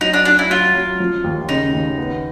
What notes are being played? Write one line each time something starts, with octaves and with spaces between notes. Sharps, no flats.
F#3 D#4
D4
F#3 D4
E4
F#3 F4
F#3
F3
D#2
C#3 D#4
D#2
B3